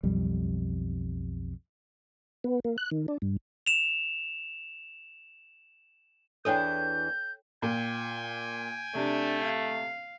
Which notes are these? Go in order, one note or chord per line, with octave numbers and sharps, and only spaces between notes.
B1 F2 G3
B3
A#3
F#6
D#3
D4
G2
E7 F7
E2 E3 D4 A4 C#5 G5 G6
A#2 G5 G#5
C3 A3 D4
F5